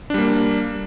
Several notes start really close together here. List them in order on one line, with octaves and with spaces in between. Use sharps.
D4 G3 A#3